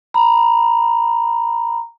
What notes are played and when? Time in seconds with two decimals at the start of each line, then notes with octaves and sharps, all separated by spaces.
0.14 A#5 B5